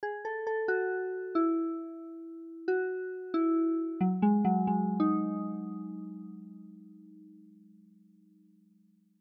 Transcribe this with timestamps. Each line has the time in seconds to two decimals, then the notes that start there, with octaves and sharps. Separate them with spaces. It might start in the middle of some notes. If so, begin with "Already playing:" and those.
0.03 G#4
0.25 A4
0.47 A4
0.68 F#4
1.35 E4
2.68 F#4
3.34 E4
4.01 F#3
4.22 G#3
4.45 F#3
4.67 G#3
5.00 D#4